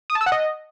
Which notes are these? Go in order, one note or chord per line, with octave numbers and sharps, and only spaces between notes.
D#6
A5
E6
F#5
D#5